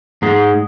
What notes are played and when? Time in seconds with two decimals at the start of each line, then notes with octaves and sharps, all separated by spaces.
0.22 G#2 G#3